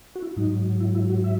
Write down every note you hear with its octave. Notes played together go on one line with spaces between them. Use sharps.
F#4
E4
G#2 F#3 D#4
E4
E4
F#4
E5